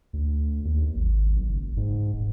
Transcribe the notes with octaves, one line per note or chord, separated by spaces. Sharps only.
D2
D#2
G#1
B1
F#1
G#2
D#1